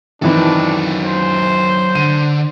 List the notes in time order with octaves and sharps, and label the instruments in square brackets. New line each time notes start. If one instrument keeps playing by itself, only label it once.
[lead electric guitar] F#2 A4 [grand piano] D#3 E3 C4 [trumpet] D4
[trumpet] C5
[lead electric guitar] D3 [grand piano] D#7